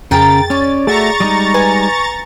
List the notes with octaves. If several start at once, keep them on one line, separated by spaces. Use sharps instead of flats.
F2 C#3 G#4 A#4 G5 A#5 A6
C#4 C#5 D5
A3 F#4 G#4 E5 A#5 C#6 A6
G3 G#3 D#4 D#6
B4 G#5